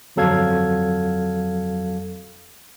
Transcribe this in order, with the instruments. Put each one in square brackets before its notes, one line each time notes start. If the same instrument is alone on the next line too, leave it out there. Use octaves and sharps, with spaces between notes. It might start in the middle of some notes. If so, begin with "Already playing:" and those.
[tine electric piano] G1 F2 F#3 A4 F5 G#6